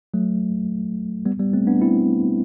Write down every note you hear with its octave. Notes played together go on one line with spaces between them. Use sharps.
F#3 A3
G3 B3
G3 B3
A3 C4
B3 D4
C4 E4